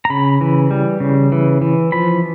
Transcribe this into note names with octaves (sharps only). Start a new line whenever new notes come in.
A#5
C#3 B5
E3
G3
C#3
E3
E3
F3 B5